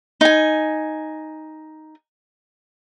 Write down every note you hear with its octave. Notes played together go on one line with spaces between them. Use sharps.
D#4 G#5